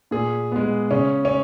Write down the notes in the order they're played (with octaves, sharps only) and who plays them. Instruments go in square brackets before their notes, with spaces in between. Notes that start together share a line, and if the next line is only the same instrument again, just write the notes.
[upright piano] A#2 G#4
G#3 B3
C#3 C#4
C#4